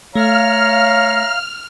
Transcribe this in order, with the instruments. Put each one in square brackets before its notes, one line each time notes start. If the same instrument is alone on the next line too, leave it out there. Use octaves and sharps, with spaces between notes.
[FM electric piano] A3 [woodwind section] C#5 E5 F5 [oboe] A#5 [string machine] F6